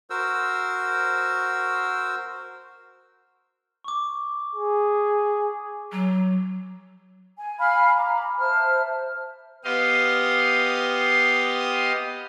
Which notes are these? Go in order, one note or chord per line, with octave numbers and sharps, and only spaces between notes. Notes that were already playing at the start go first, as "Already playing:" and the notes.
F#4 A#4 C5 E6
C#6 D6
G#4
F#3
G#5
F5 G#5 B5 F6
A#5 B5 D6
C5 E5 A5 F6
B3 G4 D#5 F5 C6 D#6